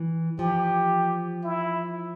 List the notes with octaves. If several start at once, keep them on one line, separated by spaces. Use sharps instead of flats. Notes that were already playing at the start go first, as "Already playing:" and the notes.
Already playing: E3
F3 G4
E4